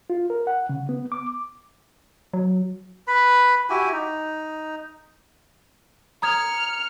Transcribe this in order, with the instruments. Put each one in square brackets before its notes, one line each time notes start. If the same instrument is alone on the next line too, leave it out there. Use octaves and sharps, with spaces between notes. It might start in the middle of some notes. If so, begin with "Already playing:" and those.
[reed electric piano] F4
A#4
F#5
C#3
B3
D6
[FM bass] F#3
[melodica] B4 B5
E4 F#4 G4 G#5
D#4
[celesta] A#5 D#6 G#6 [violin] F6 C#7